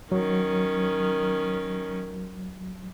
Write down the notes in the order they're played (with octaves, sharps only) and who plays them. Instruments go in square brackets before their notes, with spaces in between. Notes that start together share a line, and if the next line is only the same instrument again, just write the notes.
[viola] D#3 C#4 [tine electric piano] F#3